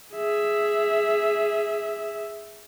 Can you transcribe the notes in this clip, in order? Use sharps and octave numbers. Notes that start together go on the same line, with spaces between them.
G#4 E5